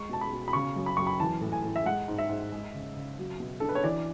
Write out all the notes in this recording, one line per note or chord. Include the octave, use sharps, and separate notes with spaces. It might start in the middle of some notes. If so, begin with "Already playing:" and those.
Already playing: G#3 C#6
B2 A5
B5
B2
B5
C#3 C#6
F#2
B5
F#2 C#6
B5
E3 A5
A2
G#5
A2
E5
G#3 F#5
G#2
E5
G#2
G#3
C#3
C#3
F#3
B2
D4 A4
B4
C#5
E3 D5